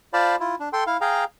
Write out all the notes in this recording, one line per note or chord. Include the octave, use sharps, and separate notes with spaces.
F4 C5 D5 F5 A5 B5
E4 F4
D4
A4 G5 C6
E4 F5
G#4 F5 G5 A#5